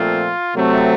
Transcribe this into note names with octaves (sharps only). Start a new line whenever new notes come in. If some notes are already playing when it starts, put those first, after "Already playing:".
Already playing: A#2 F3 A3 C4 F4
C3 F#3 A3 C4